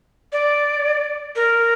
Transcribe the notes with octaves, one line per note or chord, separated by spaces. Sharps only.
D5
A#4